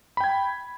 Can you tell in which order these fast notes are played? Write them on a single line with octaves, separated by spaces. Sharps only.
B5 G5 G#6